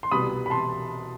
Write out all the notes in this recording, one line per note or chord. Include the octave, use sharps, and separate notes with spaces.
C6
C2 B2 G3 B3 B5 D#6
B5
A5 C6